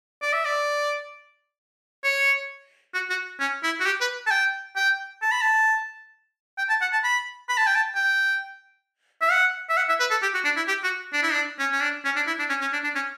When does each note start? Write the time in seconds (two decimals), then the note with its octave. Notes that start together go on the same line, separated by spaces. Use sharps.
0.22 D5
0.33 E5
0.45 D5
2.04 C#5
2.94 F#4
3.10 F#4
3.40 C#4
3.63 E4
3.80 F#4
3.86 G4
4.01 B4
4.27 A5
4.31 G5
4.76 G5
5.22 A5
5.32 B5
5.42 A5
6.58 G5
6.69 A5
6.81 F#5
6.93 A5
7.04 B5
7.49 B5
7.58 A5
7.67 G5
7.75 A5
7.95 G5
9.21 E5
9.31 F#5
9.69 E5
9.77 F#5
9.89 E5
10.00 B4
10.11 A4
10.22 G4
10.34 F#4
10.45 D4
10.56 E4
10.68 G4
10.84 F#4
11.13 D4
11.23 E4
11.32 D4
11.59 C#4
11.72 C#4
11.82 D4
12.05 C#4
12.16 D4
12.27 E4
12.39 D4
12.49 C#4
12.61 C#4
12.73 D4
12.84 D4
12.95 C#4